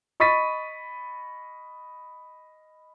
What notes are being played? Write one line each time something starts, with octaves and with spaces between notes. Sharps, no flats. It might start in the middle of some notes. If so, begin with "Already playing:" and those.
D#5 B5 C#6 A6 B6 D#7